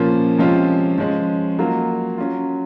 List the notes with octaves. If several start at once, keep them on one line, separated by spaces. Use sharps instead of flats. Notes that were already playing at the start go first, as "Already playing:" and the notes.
Already playing: A#2 F3 A#3 C#4 F4
C3 F3 G#3 C#4 F4
F3 G#3 C#4
F#3 A#3 F4
F#3 C#4 F4